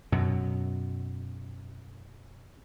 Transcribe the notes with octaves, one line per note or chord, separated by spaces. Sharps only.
F#2 B2 F#3